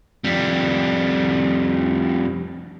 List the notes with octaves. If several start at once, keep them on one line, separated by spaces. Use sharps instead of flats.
F2 G3